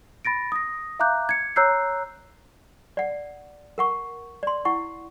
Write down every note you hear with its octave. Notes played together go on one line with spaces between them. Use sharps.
B5 A6 A#6 D7
D#6 A#6
E5 F5 A#5 D6 F#6 G6
G#6 C#7
C#5 A#5 E6 F#6 G6 C7
D5 F#5
A#4 F#5 C#6
D5 C6
E4 F#5 C#6